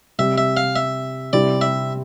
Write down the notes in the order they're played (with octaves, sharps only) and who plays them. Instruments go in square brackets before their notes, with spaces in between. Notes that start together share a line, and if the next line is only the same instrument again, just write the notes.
[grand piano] C3 G3 C4 [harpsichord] E5
[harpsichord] E5
F5
E5
[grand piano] C3 G3 C4 E4 [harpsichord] D5
[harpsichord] E5